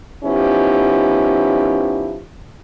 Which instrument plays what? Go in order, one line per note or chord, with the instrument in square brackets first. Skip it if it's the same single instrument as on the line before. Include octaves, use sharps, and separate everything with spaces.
[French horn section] F3 B3 C#4 D#4 E4 G4